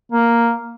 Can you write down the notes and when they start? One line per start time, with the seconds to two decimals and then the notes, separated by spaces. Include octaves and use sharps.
0.12 A#3